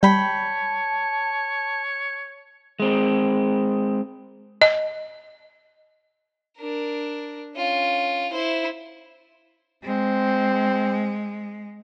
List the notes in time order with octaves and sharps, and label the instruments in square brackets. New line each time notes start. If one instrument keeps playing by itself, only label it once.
[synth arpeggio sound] G3 [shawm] C#5 [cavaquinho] G5 B5 [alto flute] A5
[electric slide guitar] G#3 C4
[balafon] D#5
[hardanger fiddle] D4 A#4
C#4 F4
E4 C5
[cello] G#3 [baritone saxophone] C4